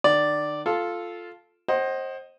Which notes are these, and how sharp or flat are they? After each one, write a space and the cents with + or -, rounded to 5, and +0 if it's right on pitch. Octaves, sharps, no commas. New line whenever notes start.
D#3 -45 D5 +0
F4 +0 A4 -5
C5 +25 D#5 +0 F#5 +40